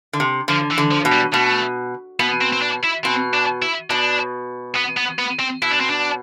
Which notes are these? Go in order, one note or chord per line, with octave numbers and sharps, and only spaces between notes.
D3
C3
D3 F3
E3
D3
F3
B2
G3
B2 A3
B2 B3
C4
C4
D4
E4
B2 C4
D4
E4
B2 D4
B3
B3
B3
C4
B2 E4
D4
C4
D4